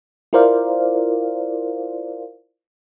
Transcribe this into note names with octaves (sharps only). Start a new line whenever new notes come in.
E4 F4 A#4 C5 D5 F5